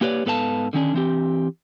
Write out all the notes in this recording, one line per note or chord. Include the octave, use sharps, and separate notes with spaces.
A#3 G4 B4 C#5 D5
G#2 B3 A4 B4 F5 A5
D3 D#3 C#4 D4
E3 C4 G4